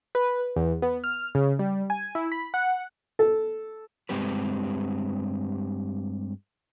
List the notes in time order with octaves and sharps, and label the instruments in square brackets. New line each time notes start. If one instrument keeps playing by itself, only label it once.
[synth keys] B4
E2
B3
F6
C#3
G3
G#5
E4
B5
F#5
[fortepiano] A4
[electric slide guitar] G2 G#3 C4 G4 B4